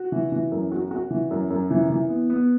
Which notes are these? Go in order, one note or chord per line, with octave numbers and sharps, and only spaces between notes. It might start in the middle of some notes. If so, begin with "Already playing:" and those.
Already playing: F#4
E3
E3
F#2
F#4
F#4
E3
F#2
F#2
E3
E3
B3
B3